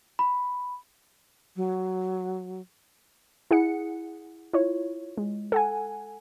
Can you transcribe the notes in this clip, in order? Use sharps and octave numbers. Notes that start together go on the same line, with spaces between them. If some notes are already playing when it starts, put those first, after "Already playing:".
B5
F#3
E4 G#4 F#5 C#7
E4 F4 C#5
G#3
A4 F#5 G#5